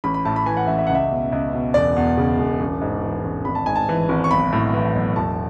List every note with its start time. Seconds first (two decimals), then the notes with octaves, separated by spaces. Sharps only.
0.04 A1 B5
0.14 B5
0.25 A2 A5
0.36 B5
0.46 E3 G#5
0.57 F#5
0.67 A1 E5
0.78 E5
0.87 C#2 F#5
0.95 E5
1.11 B2
1.32 C#2
1.53 B2
1.74 E1 D5
1.96 E2
2.17 C#3
2.39 E1
2.60 A1
2.82 G#2
3.03 E3
3.23 A1
3.45 G#1 B5
3.55 A5
3.66 G#2 G#5
3.76 A5
3.89 E3
4.09 G#1
4.24 C#6
4.31 B1 B5
4.52 A2
4.74 E3
4.95 B1
5.16 E1 A5